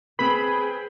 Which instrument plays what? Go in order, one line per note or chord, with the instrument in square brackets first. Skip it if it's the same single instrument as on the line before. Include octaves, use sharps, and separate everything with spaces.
[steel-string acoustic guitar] C4 B4 [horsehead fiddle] G#4 G5 [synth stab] B5